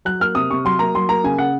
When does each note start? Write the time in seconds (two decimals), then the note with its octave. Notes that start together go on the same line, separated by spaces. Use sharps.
0.05 F#3 F#6
0.20 A#3 F6
0.35 C3 D#6
0.51 C3 C#6
0.65 F#3 C6
0.79 A#3 A#5
0.95 F#3 C6
1.09 A#3 A#5
1.24 C#3 G#5
1.39 C#3 F#5